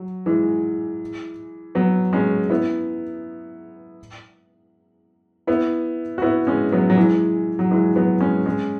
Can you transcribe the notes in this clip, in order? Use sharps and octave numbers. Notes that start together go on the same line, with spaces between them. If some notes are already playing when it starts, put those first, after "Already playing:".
Already playing: F#3
E3 G#3
F#3 B3
G#3 C#4
B3 E4
B3 E4
F#4
B3 E4
G#3 C#4
F#3 B3
F#3
E3 G#3
F#3
E3 G#3
F#3 B3
G#3 C#4
G#3 C#4